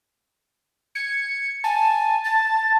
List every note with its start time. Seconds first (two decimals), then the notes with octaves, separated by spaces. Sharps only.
0.95 G#6 C#7
1.64 G#5 A5
2.24 A6